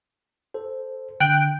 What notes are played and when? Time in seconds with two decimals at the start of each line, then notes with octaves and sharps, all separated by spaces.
0.54 A4 C5
1.20 D3 G5 F#6 D7